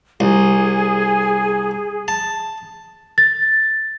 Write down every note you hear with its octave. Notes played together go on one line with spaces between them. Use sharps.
C2 G#4
A5
A6